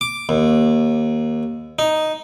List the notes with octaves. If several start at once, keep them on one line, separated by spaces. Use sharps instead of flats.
D6
D#2
D#4